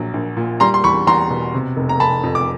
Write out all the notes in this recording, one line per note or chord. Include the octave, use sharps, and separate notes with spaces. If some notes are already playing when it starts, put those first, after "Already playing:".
Already playing: A#1 F#3
A#1
A#2
G3 A#5 C6
C6
E2 B5 C#6
E2 A#5 C6
B2
C3
F1
A#5
F1 A5 B5
F2
D6